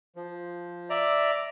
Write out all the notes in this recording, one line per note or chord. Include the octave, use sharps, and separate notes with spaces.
F3
D5 E5 A#5